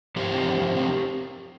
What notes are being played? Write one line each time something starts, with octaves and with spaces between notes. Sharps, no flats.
F3 G4 A#4
C4
F3
F3
C4